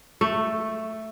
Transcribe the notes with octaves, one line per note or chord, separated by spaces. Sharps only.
A3